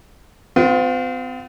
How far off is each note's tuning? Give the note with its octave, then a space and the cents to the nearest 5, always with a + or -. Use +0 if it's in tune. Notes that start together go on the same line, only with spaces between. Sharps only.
C4 -40 F4 +25